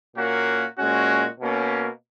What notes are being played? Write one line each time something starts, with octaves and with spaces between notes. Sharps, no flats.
A#2 A#3 C#4 F#4
A#2 G#3 C#4 F#4
B2 A#3 C#4